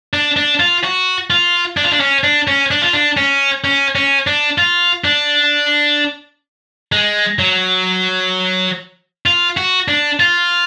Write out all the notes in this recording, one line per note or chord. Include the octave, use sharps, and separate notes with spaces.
D4
D4
F4
F#4
F4
D4
F4
D4
C#4
D4
C#4
D4
F4
D4
C#4
C#4
C#4
D4
F4
D4
G#3
F#3
F4
F#4
D4
F4